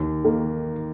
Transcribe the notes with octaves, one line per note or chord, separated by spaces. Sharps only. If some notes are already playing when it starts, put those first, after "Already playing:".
Already playing: D#2
D#3 A#3